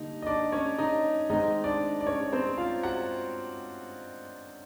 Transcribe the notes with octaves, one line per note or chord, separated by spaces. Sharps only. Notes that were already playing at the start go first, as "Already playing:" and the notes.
Already playing: D3 G3 A#3 D#4
D#5
D4 D5
C#4 C#5
D#4 D#5
D#3 G#3 C4 D#4 D#5
D4 D5
D5
C#4 C#5
C4 C5
F4 F5
F#4 F#5